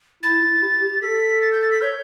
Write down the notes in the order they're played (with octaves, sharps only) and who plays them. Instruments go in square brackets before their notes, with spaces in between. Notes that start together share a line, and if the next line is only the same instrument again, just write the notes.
[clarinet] E4 [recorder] A6
[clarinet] E4
G4
G4
[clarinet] A4 [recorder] B6
[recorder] A6
G6
A6
B6
[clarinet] C#5 [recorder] G6